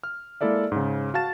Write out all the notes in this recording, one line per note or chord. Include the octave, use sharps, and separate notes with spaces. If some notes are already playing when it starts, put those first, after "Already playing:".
F6
G#3 A#3 E4 A4 D5 E5
G#2 C#3
F#4 F5 A5 A6 E7